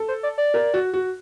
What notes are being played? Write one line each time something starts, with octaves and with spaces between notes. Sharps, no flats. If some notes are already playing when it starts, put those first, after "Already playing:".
Already playing: A4
C5
D5
D5
A#4
F#4
F#4